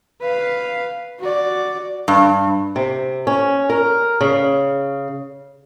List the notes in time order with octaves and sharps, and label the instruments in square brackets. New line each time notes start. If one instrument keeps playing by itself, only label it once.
[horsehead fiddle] B4 F5
F#4 D5
[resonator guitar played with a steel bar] G2
[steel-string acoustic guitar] C3
C#4
A#4
C#3